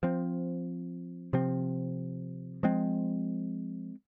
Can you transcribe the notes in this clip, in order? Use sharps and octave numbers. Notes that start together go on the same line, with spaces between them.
F3 C4
C3 F3 C4
F3 G#3 C4